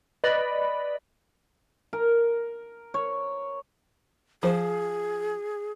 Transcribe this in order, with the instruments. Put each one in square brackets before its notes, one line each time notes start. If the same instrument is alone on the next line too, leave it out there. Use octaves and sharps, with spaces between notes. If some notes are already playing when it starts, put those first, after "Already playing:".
[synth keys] B4 D5 D#5 B5
[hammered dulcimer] A#4
C#5
[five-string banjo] F3 C5 [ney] G#4